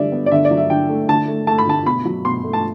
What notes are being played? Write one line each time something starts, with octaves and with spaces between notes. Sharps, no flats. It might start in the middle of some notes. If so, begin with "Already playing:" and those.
Already playing: D3 G3 D5 E5
B3
D5
D3 E5
D5
F#3
E5
D3 G5
A3
D3 A5
A3
A3 A5
B5
D3 A5
B2 B5
F#3
B2 C6
A3
A5